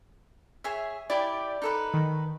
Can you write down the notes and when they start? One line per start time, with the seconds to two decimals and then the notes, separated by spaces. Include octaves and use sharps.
0.64 G#4 C#5 E5
1.10 E4 G4 D5
1.62 D#4 A4 B4
1.94 D#3